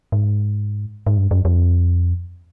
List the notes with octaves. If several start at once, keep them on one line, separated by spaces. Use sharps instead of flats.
G#2
G#2
G2
F#2
F2